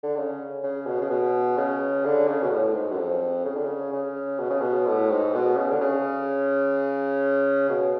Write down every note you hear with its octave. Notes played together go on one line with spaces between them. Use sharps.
D3
C#3
C#3
B2
C#3
B2
C#3
D3
C#3
B2
A2
G#2
F#2
F2
C#3
D3
C#3
C#3
B2
C#3
B2
A2
G#2
B2
C#3
D3
C#3
B2